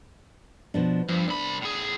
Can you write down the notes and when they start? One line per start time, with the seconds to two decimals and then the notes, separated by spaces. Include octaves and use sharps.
0.74 B2 F3 D4
1.09 G2 F3
1.28 C2 D4 B5
1.62 A2 G#4